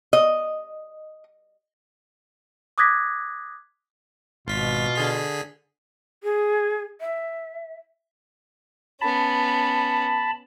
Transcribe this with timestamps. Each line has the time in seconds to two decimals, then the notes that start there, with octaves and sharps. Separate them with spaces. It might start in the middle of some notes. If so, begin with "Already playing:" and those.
0.13 D#5
2.78 D6 D#6 F#6 G#6 A#6 B6
4.48 G#1 B2 F4 B6
4.95 D3 G#4 B6
6.23 G#4
7.01 E5
9.01 B3 C#4 A5 B5